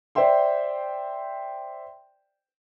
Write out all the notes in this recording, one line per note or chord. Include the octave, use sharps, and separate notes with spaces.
C5 D5 E5 G5 C6